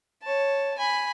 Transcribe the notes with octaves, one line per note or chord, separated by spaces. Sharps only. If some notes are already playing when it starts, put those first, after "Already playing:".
C#5 A5
G#5 B5